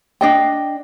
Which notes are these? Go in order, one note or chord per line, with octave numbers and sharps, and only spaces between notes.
D4 D#5 G5